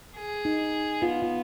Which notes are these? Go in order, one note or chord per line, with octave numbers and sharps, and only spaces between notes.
G#4
D#4
B3 F4
F4